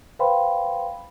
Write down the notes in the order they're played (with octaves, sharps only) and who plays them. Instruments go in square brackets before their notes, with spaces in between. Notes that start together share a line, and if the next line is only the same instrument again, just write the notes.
[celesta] B4 C5 F5 G5 B5 C6